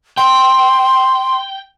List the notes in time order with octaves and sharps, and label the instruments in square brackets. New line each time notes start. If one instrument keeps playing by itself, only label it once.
[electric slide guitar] G5 [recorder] C6